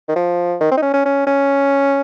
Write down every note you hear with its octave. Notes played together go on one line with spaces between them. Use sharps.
D#3
F3
D#3
C4
D#4
C#4
C#4
C#4
C#4